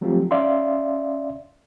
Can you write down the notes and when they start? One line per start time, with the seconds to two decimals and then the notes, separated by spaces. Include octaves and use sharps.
0.01 F3 F#3 A3 C4 F4 G4
0.31 C#4 D5 E5 F5 C6